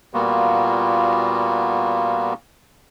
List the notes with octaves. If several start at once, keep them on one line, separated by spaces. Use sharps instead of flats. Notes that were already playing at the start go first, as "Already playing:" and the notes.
A#2 G3 A#3 B3 F4 F#4